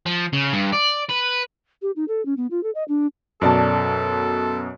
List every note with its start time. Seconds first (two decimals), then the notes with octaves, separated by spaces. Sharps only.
0.06 F3
0.33 C#3
0.53 G2
0.73 D5
1.09 B4
1.82 G4
1.96 D#4
2.08 A4
2.26 C#4
2.37 B3
2.51 F4
2.63 A4
2.75 D#5
2.88 D4
3.42 F#2 B2 A4 C#5 D5 A5